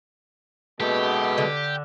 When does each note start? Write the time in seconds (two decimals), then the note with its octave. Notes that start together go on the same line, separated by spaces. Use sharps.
0.80 B2 G#3 G4 A4
1.38 D3